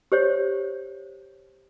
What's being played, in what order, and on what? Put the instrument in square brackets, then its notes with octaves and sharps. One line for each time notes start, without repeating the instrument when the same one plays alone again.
[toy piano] G4 C5 C#5